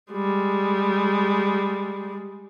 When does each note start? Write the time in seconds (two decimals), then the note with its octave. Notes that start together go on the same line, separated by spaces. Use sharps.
0.13 G3 G#3